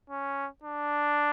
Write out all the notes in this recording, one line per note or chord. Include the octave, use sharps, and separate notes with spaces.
C#4
D4